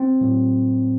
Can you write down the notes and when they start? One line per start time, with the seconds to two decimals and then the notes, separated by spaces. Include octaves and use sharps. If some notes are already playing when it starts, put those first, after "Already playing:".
Already playing: C4
0.21 A2 F#3